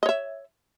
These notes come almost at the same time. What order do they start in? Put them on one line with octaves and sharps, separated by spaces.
D#5 C#5 E5